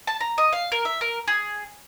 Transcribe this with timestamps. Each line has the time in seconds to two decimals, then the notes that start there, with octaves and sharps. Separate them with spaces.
0.07 A5
0.21 A#5
0.38 D#5
0.53 F5
0.72 A#4
0.85 E5
1.01 A#4
1.28 G#4